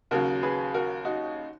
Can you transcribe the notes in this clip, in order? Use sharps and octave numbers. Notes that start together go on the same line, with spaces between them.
D#2 C#3 F#3 F#4 A#4
G#4 B4
F#4 A#4
D#4 F#4